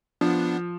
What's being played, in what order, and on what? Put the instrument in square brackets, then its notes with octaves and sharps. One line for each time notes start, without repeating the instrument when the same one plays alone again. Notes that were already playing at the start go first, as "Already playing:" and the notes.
[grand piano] F3 [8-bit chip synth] B3 D4